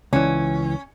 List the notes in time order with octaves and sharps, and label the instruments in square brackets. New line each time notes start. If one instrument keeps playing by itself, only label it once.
[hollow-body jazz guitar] C#2 E3 [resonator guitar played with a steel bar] C#4